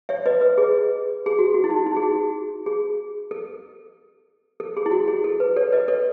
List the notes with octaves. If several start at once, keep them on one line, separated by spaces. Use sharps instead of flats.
C#5 E5
B4 D#5
B4
G#4
G#4
F#4
F#4
E4
D#4
D#4
G#4
F#4
G#4
A4
A4
G#4
E4
F#4
G#4
A4
B4
A4 C#5
B4 D#5
A4 C#5